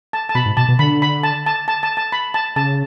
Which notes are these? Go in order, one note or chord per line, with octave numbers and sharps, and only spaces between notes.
A5
A5
B2 B5
G#2
B2 A5
B2
D3 B5
B5
A5
A5
A5
A5
A5
B5
A5
C#3 A5